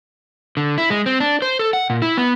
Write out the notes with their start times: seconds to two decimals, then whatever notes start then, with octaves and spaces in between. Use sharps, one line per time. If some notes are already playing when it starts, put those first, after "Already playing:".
0.57 D3
0.78 E4
0.90 G#3
1.06 C4
1.20 D4
1.42 C5
1.59 A4
1.73 F#5
1.90 A#2
2.02 E4
2.17 B3